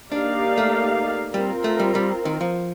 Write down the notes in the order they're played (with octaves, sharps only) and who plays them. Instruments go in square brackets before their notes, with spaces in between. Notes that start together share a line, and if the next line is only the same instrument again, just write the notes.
[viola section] A#3 D#4 G4 D5 F5 [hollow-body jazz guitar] D4
[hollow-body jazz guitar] A3
[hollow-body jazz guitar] G3 [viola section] C4 F4 A#4
[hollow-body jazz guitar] A3
G3
G3
D#3
F3